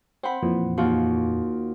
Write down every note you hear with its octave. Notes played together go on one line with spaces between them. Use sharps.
C4 C5 F#5 B5
F2 A#2 E3
D#2 F4 F#4